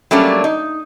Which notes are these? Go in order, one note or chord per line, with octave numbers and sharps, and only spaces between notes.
F#3 G3 A3 A#3 C#4 D4
D#4